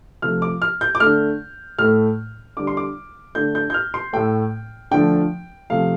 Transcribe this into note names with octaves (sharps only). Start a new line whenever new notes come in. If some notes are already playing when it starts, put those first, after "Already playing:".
C3 F3 A3 F6
D6
F6
G6
D6
D3 A3 F6
A2 A3 F6
D3 G3 D6
C6
D6
D3 A3 G6
G6
G6
F6
C6
A2 A3 G5
D3 F3 A3 G5
C3 F3 A3 F5